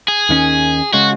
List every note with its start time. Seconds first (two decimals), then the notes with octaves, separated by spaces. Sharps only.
0.08 G#4
0.29 D#2 D#3 A#3 C#4
0.93 C#3 G#3 F#4